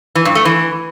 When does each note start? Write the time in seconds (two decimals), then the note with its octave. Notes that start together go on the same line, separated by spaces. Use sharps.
0.15 E3
0.25 G2
0.35 A3
0.45 E3